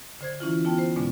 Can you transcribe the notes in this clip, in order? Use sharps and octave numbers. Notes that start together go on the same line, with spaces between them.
D3 C5 G#6
E3 C#4 E4 F4
B3 C#4 F4 G5 A5
C5
F2 B2 D3 G#3 B3 C#4